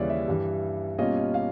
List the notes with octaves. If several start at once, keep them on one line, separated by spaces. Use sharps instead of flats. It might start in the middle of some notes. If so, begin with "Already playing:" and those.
Already playing: D#2 C#3 E3 G3 C#5 D5
E5
G2 E3 G3
B2 G3 A#3 C#4 F4 D#5
D#5
F5